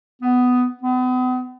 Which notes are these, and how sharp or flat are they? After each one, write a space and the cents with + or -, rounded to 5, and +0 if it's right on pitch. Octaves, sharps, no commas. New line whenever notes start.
B3 +10
B3 +40